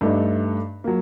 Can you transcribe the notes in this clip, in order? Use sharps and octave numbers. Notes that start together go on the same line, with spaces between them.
G2 A3 D4 D#4
F#3 A#3